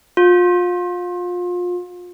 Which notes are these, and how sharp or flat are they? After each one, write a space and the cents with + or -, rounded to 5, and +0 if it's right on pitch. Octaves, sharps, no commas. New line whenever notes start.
F4 +30